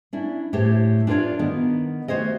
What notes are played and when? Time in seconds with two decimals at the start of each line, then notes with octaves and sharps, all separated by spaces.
0.13 C#4 D4 E4
0.53 A2 G4 A4 C5 C#5
1.07 D4 F4 A#4 C#5 D5
1.39 D#3 B3 A#4
2.08 A3 F#4 C5 C#5 D#5